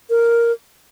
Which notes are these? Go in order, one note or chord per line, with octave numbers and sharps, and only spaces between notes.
A#4